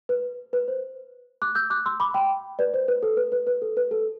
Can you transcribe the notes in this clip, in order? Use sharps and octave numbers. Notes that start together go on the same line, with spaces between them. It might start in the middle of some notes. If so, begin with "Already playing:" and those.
B4
B4
C5
D6 F#6
E6 G6
D6 F#6
C6 E6
B5 D6
G5 B5
B4 D5
C5
B4
A4
B4
B4
B4
A4
B4
A4